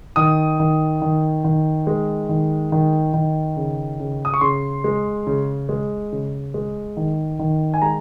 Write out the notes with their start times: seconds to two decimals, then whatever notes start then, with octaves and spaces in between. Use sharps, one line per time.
0.16 D#3 D#6
0.60 D#3
1.02 D#3
1.44 D#3
1.87 G#3
2.29 D#3
2.72 D#3
3.14 D#3
3.57 C#3
4.00 C#3
4.25 D#6
4.34 C#6
4.41 C#3 C6
4.84 G#3
5.27 C#3
5.69 G#3
6.12 C#3
6.54 G#3
6.97 D#3
7.39 D#3
7.74 G#5
7.82 G#3 A#5